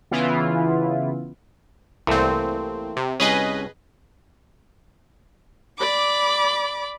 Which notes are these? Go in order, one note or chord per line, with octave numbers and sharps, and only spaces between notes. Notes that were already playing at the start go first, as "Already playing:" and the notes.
C#3 E3 B3 E4 F4
C2 E3 A3 A#3 C4
C3
C2 C#4 G#4 B4 D#5
D5 B5 D6